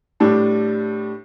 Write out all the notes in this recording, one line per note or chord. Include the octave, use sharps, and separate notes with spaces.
A2 G3 D4 A4